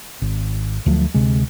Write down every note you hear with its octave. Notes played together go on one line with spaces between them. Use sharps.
G#1
D2 F3 F#3 A3
D2 C3 G#3